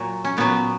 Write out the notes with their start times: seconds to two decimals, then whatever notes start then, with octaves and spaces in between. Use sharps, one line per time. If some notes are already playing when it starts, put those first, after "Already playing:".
Already playing: A#2 F#3
0.24 C#4
0.37 A#2 F#3 B3